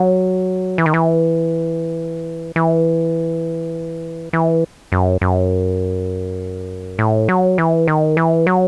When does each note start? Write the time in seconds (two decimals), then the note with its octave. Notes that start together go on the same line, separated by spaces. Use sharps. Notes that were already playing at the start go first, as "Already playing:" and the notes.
Already playing: F#3
0.78 E3
0.86 D#3
0.94 E3
2.56 E3
4.33 E3
4.92 F#2
5.21 F#2
6.99 A2
7.29 F#3
7.58 E3
7.88 D#3
8.17 E3
8.47 F#3